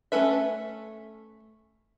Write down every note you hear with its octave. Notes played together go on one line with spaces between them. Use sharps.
A3 C#4 A4 B4 E5